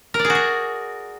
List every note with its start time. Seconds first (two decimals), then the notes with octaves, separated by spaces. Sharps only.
0.14 A#4
0.19 D5
0.25 G#4
0.30 F#4
0.35 G#4